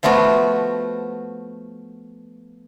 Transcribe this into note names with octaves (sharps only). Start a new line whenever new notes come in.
F3 A3 B3 F4 F#4